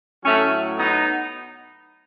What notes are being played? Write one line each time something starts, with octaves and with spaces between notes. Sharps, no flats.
A2 F#3 A3 C#4
B3 D#4